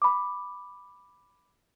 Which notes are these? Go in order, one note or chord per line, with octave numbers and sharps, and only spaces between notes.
B5 D6